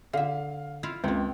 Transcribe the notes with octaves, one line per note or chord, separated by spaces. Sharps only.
D3 E5 F5
E4 F4 F5
C#2 A#3 C4